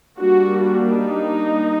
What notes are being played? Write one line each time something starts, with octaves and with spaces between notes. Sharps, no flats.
G3 A#3 D4 F#4
D#4